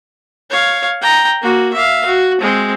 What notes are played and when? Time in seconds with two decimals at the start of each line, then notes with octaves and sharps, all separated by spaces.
0.50 C#5 F5
1.01 G5 A#5
1.42 A#3 F#4
1.73 E5 F5
2.06 F#4
2.41 G#3 C4